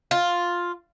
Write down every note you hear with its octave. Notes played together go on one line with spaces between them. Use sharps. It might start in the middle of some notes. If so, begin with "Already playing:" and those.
F4